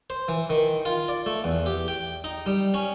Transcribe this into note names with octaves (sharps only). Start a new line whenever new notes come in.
C5
E3
D#3
F4
D5
A3
E2
G4
G5
D#4
G3
C#4